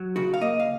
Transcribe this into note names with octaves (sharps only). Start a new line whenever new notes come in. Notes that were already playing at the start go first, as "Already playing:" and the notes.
Already playing: F#3
C#3 F#4
F5
A#3 D#5
F5